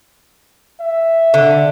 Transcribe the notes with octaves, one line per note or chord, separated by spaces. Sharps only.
E5
D3